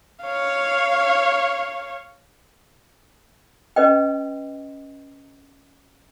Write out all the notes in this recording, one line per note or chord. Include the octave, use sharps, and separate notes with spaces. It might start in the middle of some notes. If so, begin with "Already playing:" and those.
C#5 F5
C#4 B4 D#5 G5